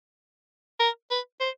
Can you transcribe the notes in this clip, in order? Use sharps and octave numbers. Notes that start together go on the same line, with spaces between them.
A#4
B4
C5